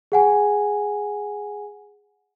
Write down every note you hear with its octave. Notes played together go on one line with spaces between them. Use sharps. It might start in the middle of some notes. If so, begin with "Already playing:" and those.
G#4 F#5 G#5